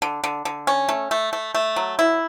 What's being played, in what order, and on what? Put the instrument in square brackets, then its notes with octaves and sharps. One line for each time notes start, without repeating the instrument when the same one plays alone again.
[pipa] D3
D3
D3
C#4
A3
A3
A3
A3
F#3
E4